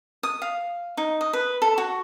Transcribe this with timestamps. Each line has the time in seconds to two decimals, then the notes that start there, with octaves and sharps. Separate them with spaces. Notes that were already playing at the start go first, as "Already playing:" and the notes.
0.23 D#6
0.42 F5
0.97 D#4
1.21 D#5
1.33 B4
1.62 A4
1.78 F#4